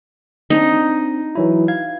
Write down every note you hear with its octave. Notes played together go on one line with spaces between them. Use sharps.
C4 D4 D#4
E3 F#3 E4
F5 G#6